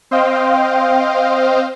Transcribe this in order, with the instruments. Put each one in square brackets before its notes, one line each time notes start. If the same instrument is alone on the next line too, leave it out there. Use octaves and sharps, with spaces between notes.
[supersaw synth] C4 C5 D#5 F5 G5